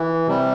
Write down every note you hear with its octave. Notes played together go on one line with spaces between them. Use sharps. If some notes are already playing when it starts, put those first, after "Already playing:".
Already playing: E3
C3 G3